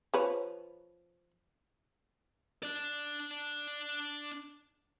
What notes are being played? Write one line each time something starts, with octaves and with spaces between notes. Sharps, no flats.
F3 B4 C#5
D4 D5